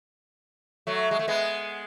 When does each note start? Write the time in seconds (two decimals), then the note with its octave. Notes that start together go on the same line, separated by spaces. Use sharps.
0.87 F#3 A3
1.11 G#3
1.19 A3
1.28 G#3 B3